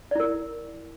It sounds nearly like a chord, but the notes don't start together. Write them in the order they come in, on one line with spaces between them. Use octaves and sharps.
D5 E4 A#4